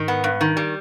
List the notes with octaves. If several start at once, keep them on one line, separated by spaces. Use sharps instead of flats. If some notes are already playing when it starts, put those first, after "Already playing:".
Already playing: G#2 D#3
B3
G2
D#3
G3